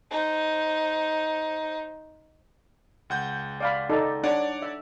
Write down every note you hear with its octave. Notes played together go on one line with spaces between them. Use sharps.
D#4 C5
C#2 F#5 G6
D5 F5 B5
D#4 A4 D5
D4 C#5 D5 F#5
E5